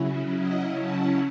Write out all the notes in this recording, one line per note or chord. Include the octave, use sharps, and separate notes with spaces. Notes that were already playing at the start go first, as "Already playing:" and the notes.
Already playing: C#3 F#3 C#4 E4
D#5 F#5
F#5 A5